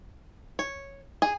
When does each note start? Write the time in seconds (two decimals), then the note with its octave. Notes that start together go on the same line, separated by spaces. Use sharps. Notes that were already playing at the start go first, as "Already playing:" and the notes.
0.59 C#5
1.22 G#4